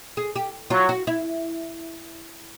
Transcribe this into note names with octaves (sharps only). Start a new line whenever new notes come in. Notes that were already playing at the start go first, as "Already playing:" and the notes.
G#4
G4
F#3 F4
F#4
E4